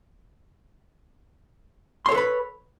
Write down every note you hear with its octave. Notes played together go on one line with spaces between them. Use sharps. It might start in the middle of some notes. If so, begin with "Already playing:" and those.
A4 B4 C#5 B5 C6